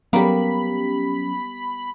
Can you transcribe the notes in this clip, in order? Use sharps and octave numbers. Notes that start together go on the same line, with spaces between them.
F#3 G3 A#3 B3 C#4 G4 B5